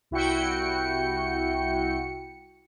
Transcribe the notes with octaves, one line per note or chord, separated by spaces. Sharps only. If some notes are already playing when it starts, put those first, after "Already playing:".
C2 E4 F#4 G5 C#7